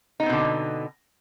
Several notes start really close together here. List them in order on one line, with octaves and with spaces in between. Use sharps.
D#4 B3 C4 B2 D3